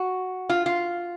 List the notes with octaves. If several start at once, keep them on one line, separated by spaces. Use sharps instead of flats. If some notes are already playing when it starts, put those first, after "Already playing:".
Already playing: F#4
F4
F4